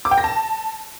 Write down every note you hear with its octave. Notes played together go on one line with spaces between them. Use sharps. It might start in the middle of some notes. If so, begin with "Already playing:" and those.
D6
G5
A#6
A5